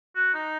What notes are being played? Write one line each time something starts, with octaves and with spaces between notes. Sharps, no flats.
F#4
D#4